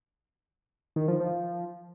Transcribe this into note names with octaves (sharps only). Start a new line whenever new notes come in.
D#3
F3
F3